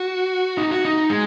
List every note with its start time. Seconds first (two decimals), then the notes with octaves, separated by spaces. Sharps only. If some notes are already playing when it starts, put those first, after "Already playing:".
Already playing: F#4
0.58 D#4
0.71 F#4
0.85 D#4
1.10 G#3